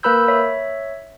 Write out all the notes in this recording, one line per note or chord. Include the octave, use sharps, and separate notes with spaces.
A#3 A#4 B4 B5 E6 G6
C#5 E5